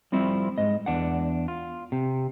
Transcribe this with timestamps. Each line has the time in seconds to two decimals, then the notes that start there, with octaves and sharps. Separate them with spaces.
0.12 F3 G3 C4 E4
0.58 G#2 G#3 D#5
0.86 E2 D4 F#5
1.48 F4
1.92 C3